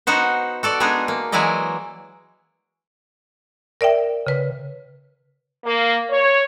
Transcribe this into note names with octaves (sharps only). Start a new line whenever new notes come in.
B3 D#4 F#4 C5
F#4 A4 D5
G#3 B3 D4 D#4 G#4
A#3
E3 F#3 G#3 E4 D5 D#5
A#4 D5 E5 G5
C#3 B4
A#3
C#5